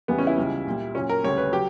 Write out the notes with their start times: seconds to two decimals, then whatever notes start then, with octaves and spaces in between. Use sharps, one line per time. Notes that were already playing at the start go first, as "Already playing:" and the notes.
0.08 E2 C#3 E3 G3 B3
0.18 C#4
0.27 E4
0.38 C#2 C#3 G3
0.67 A#2 G3
0.95 A#2 F#3 C#4
1.09 A#4
1.24 D2 C#3 G3 C#5
1.38 B4
1.52 F#3 G4